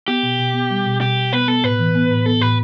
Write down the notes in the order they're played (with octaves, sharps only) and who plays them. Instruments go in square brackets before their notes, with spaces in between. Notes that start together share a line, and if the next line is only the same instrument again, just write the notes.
[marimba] B3 [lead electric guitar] G4
[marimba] B2
B2
B3
G3
B2
[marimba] B2 [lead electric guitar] G4
[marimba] B2
[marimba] B3 [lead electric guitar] B4
[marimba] B3 [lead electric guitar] A4
[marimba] A2 [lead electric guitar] B4
[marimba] E3
B3
A2
[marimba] B3 [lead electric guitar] A4
[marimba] A2 [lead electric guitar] B4